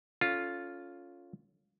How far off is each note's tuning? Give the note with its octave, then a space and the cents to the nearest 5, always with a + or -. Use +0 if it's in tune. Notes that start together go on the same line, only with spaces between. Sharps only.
C#4 +15 F4 +0 A4 +0